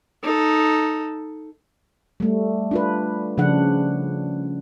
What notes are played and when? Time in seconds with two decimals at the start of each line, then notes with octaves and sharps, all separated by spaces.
0.23 D#4 A4
2.20 G3 A3
2.71 D4 F4 B4
3.38 C#3 F3 D4 F#5